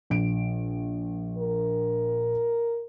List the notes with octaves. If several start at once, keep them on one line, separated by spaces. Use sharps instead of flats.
A#1 D7
A#4